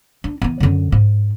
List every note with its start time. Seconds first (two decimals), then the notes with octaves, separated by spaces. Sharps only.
0.24 D4
0.42 E3 B3
0.60 F#2 D3
0.92 G#2